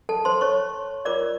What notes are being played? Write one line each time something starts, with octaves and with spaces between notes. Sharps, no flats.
A4 A5
C5 C6
C#5 C#6
F4 A#4 C#5 D5 D6